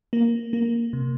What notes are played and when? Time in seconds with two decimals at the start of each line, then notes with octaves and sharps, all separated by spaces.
0.13 A#3
0.53 A#3
0.93 C3